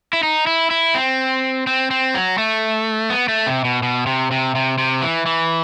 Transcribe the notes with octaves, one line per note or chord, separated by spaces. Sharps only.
E4
D#4
E4
E4
C4
C4
C4
F#3
A3
B3
A3
C3
B2
B2
C3
C3
C3
C3
E3
E3